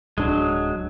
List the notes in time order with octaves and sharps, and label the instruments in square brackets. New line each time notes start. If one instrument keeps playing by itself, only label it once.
[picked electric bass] D1 D4 [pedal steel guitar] F#3 G#3